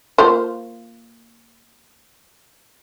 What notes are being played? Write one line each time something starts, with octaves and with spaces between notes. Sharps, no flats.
A#3 F4 C5